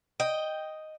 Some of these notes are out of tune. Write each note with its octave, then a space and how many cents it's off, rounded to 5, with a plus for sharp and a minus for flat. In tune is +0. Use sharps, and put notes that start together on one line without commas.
D#5 +0 G5 +0